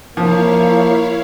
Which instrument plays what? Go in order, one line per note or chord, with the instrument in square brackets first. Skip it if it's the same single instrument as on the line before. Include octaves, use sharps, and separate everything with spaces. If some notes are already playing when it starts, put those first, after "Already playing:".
[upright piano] F3 [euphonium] A#3 [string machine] E4 C#5 F5